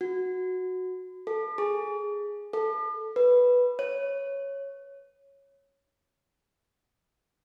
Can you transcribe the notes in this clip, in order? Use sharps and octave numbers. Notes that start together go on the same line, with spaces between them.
F#4
A4
G#4
A4
B4
C#5